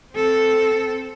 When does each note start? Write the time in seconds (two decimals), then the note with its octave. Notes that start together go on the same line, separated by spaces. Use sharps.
0.13 C4 A4